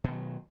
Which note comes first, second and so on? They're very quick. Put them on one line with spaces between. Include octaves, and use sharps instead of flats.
B2 D#3 F#3